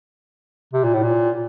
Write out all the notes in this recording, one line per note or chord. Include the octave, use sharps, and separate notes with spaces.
C3
A#2
A2
A#2